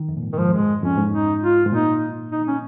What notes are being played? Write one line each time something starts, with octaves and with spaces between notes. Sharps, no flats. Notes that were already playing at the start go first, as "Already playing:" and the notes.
Already playing: D#3
F2
A#2
G#2
D#3
G#2 F3
F2 G#3
G#2
F2 C#4
G#2
D#4
F4
G#2
A#2 D#4
D#4
C#4